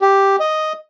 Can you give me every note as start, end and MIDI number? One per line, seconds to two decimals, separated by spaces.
0.02 0.36 67
0.40 0.73 75